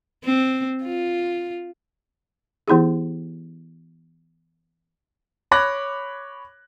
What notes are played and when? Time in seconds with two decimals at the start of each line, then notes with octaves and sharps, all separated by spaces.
0.25 C4
0.84 F4
2.68 E3 B3 E4 G4 G#4
5.51 C#5 B5 D6 F#6 A#6